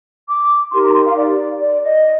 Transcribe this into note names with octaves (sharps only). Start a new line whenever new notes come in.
D6
D#4 G4 A#4 C6
A#5
C6
F5
D5
D5
D#5